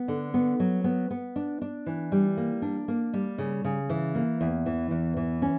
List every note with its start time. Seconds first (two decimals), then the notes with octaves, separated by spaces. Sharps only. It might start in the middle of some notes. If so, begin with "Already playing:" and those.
Already playing: B3
0.08 D3
0.34 B3
0.60 F#3
0.84 B3
1.11 B3
1.36 D4
1.62 D4
1.86 E3
2.12 G3
2.37 A#3
2.62 D4
2.88 A#3
3.14 G3
3.38 C#3
3.64 C#3
3.90 E3
4.15 A#3
4.41 E2
4.66 E3
4.91 E2
5.17 E3
5.42 C#4